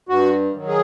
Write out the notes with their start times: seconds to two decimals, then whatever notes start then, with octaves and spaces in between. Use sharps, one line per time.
0.09 G2 F#4
0.53 D#3 F#3
0.68 G#4